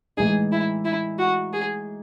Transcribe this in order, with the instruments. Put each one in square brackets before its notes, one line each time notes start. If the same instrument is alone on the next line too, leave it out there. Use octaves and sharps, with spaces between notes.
[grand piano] A2 E3 G#3 D#4 [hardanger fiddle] G#4
[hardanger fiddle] E4
E4
F#4
G#4